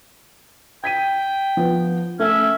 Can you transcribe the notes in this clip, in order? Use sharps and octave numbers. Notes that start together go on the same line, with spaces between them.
G5 G#6 B6 D#7
F3 B3
A3 C#4 E5 G#6